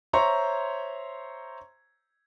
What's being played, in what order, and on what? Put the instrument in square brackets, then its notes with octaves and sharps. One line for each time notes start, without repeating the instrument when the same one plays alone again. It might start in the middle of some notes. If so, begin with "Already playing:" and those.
[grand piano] C5 C#5 E5 A#5 C6 C#6